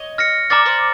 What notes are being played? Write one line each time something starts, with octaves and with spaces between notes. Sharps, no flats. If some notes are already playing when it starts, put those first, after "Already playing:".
Already playing: C#5 D#5
F6 A#6 C#7
C5 D5 A#5 D6 F6 A6
C5 D5